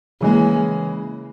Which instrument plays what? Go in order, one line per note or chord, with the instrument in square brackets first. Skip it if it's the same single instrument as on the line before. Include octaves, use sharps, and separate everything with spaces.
[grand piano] C#3 E3 G#3 [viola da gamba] A#3